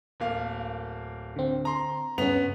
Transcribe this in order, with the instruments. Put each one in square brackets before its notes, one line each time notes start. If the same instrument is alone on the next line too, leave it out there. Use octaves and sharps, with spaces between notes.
[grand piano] D1 A#3 F5
[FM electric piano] D3 C4
[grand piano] A#5 C6
[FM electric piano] G2 C#3 C#4 [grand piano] B3 F7